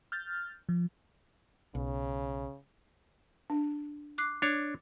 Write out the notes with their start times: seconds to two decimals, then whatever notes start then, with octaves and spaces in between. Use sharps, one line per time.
0.12 F6 G6 A6
0.69 F3
1.75 B1 C#3
3.50 D4
4.18 D6 F#6 C7
4.42 D4 C#5